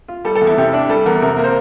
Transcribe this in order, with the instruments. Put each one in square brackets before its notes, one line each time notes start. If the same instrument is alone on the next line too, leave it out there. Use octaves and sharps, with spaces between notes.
[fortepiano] F4
[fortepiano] G3 [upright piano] A4
[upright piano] A4
[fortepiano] E2
[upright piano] E4
[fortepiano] C3 [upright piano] G4
[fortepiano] D4
[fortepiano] G3 [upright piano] A4
[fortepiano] E2 [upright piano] A#4
[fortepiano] C3 [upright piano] A#4
[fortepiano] A#3
[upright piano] C5